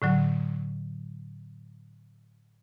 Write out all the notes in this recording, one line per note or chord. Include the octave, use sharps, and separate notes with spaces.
A2 D3 F#3